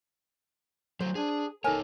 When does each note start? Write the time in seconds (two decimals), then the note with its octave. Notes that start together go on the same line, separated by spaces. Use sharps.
1.00 F#3 A3 C5
1.15 D4 G#4
1.64 D#4 A4 A#4 C#5 G#5